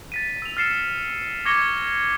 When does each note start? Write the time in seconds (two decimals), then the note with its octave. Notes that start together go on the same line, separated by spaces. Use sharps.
0.12 A6 B6 D#7
0.42 E6 F7
0.57 F6 A6 C7 C#7 E7
1.45 C#6 D6 G#6 A#6 C#7 G7